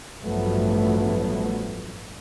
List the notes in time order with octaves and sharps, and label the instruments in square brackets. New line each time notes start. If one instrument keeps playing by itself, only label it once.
[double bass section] A1 G2 F3 F#3 A3 B3